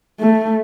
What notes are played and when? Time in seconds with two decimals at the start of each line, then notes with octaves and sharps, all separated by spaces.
0.20 A3